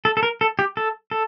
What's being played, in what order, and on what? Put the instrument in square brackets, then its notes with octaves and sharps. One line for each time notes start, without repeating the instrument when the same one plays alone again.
[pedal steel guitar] A4
A4
A#4
A4
G4
A4
A4